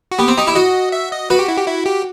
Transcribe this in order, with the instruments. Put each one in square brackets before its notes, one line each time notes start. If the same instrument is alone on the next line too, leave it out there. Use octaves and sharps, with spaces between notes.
[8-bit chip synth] F#4
[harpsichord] B3 [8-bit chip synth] G4
[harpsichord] C4
[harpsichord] D#4 [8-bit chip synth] G4
[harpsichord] E4
[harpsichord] F#4 [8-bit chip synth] D#5
[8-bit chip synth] E5
D#5
[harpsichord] F#4 [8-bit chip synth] B4
[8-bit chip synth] G4
E4
G4
E4
G4